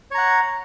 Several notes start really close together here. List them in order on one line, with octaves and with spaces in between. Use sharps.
C#5 A#5 F#5